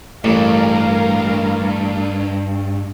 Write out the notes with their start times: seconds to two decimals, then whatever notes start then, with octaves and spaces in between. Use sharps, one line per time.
0.24 A1 G2 A#4 F5